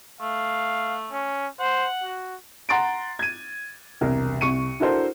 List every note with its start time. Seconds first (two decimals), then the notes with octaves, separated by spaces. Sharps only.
0.21 A3 F5
1.12 C#4
1.60 C5 F#5
2.04 F#4
2.69 F#5 A#5 C6 A6 D7
3.19 G#6 D#7
4.01 E1 C2 A#4
4.41 C2 C#6 C#7 D#7
4.80 D4 E4 F#4 A4 A#4 C5